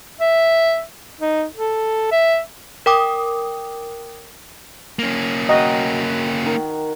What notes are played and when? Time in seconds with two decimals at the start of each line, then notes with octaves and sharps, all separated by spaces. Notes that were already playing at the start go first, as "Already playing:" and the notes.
0.20 E5
1.21 D#4
1.55 A4
2.11 E5
2.86 A#4 G5 D6 D#6
4.99 A#3 C#4
5.49 F#4 A#4 D#5 G5
6.46 D#3